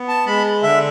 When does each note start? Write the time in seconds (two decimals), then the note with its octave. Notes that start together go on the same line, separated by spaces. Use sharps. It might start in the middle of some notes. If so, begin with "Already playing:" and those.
Already playing: B3
0.08 A5
0.26 G#3 B5
0.63 D3 E5